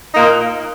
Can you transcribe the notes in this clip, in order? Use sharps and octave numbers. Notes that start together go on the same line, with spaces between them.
A#2 A#3 D#4